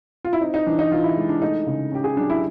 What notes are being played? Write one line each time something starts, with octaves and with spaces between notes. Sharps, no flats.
F4
E4
C4 D#4
D#4
E3 D4
D#4
E3 F4
E4
G#3
D4
A3 D#4
C#3
C#4 G4
G#4
F#3 D4
E4